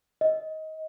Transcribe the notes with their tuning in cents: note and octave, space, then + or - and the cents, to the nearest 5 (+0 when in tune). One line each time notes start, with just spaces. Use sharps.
D#5 +20